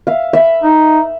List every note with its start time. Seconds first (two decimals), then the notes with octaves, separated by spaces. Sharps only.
0.07 E5 F5
0.33 E5 B5
0.63 D#4